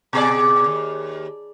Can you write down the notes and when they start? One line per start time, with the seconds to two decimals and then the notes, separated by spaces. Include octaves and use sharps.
0.13 B2 G#4 D5
0.66 D#2